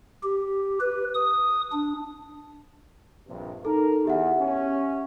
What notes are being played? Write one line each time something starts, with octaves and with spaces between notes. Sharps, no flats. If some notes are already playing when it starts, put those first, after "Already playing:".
G4
B4
D#6
D4
A#1 G2 C3
D#4 A4 A#4
E2 G4 E5 F#5
C#4